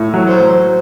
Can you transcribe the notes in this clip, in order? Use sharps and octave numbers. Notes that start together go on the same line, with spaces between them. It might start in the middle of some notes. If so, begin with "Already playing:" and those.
Already playing: A2
F#3
C5
F#3